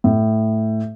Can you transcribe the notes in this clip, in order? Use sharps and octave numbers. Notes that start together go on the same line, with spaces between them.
A2